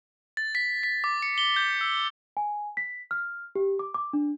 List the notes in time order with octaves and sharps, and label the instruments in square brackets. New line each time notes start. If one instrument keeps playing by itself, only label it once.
[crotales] A6
B6
B6
D6
C#7
G7
G6
E6
[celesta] G#5
B6
F6
G4
D6
D6
D4